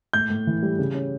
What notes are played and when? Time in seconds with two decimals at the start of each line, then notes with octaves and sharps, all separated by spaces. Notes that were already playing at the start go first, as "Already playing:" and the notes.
0.13 A2 G6
0.30 A2
0.47 E3
0.63 G3
0.79 C#3
0.95 C#4